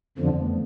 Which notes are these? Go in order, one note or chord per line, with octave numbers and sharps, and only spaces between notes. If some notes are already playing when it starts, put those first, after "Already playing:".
F2 D3 F3 B3
C4
A3 B3